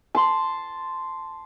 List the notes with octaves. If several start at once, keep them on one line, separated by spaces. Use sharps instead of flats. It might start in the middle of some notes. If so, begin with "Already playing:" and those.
A5 C6